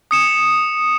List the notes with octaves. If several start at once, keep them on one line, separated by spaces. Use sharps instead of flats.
D#6 C#7 E7